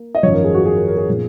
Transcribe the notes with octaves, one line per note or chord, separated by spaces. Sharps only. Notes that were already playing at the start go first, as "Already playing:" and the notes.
Already playing: A#3
D#5
G#1 F#2 F3 C#5
A#4
G#4
F#4
G#4
A#4
A#4
G#4
A#2 F3 B3